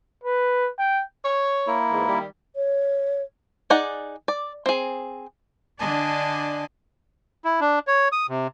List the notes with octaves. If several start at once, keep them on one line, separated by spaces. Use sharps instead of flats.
B4
G5
C#5
A#3 E4
E2 G#2
D#3 G3
C#5
D#4 G#4 D5 F#5
D5
C4 G#4
D3 D4 D5 D#5 G#5 A5
E4
D4
C#5
D#6
C3